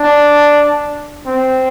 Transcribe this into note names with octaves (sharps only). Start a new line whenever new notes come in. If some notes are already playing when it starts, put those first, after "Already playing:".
Already playing: D4
C4